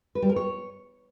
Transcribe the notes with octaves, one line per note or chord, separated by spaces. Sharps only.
B4
G3
A#4
C#5